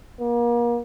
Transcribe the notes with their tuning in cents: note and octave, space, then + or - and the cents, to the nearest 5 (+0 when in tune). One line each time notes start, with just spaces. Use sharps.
A#3 +35